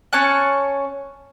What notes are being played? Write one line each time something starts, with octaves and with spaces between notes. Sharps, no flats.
C#4 C#5 A5 F#6